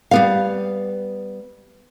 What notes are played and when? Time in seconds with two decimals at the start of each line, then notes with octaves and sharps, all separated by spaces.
0.11 G3 B3 F5